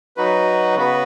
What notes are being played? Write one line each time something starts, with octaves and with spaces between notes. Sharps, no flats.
F#3 D#4 F#4 B4
C#3 B3 F#4 B4